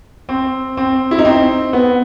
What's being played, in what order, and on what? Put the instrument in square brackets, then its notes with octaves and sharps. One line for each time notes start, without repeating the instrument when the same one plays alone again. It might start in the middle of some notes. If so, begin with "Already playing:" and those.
[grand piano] C4
C4
E4
D#4
C4
B3